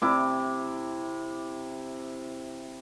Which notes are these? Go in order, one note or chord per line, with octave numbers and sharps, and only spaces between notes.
C3 E4 D6